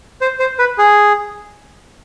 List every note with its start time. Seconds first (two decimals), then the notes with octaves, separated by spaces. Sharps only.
0.21 C5
0.39 C5
0.59 B4
0.78 G#4